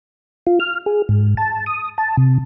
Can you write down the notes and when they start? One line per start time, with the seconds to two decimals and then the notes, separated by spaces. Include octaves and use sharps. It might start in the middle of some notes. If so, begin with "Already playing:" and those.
0.47 F4
0.60 F6
0.86 G#4
1.09 G#2
1.37 A5
1.66 D#6
1.98 A5
2.17 C3